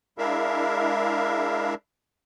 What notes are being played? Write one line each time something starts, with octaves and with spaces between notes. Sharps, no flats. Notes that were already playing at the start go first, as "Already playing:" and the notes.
G#3 D4 E4 A#4 E5 F5